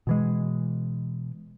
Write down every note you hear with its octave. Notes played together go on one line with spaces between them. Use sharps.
B2 E3 G#3